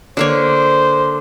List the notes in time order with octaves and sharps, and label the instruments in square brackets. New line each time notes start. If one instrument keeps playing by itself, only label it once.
[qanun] D3 A#3 C#5 [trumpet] C5